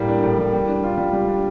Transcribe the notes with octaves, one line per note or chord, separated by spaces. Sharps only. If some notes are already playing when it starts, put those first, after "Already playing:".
Already playing: A2 G3 A#3
D4
A2
G3
G3
D4
F4
G3
G3
D4